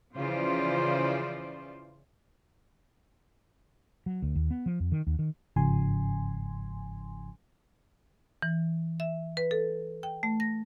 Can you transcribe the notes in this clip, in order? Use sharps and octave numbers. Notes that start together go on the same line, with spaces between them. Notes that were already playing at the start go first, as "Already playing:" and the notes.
C#3 E3 F3 F4 C5 D5
F#3
D2
D#2
B3
F3
F2
D#3
D#2
D#3
G1 G#2 C#3 F3 G#5 C6
E3
E5
B4
A4
G5
A3
A#6